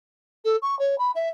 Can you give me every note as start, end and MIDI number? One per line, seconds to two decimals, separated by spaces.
0.44 0.56 69
0.62 0.77 85
0.79 0.98 73
0.98 1.11 83
1.15 1.29 76